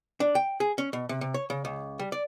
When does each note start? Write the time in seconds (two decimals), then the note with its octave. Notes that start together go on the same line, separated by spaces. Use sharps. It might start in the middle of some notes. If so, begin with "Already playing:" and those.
0.20 D4
0.35 G5
0.60 G#4
0.78 C#4
0.93 B2
1.09 C3
1.21 C3
1.34 C#5
1.50 C#3
1.65 C#2
1.99 G3
2.12 D5